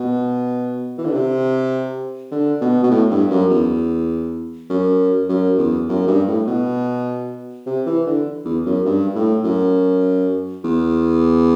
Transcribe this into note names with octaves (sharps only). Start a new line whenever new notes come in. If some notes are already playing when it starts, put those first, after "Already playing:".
Already playing: B2
E3
D3
C3
D3
B2
B2
A2
G2
F#2
E2
F#2
F#2
E2
F#2
G2
A2
B2
C3
E3
D3
E2
F#2
G2
A2
F#2
E2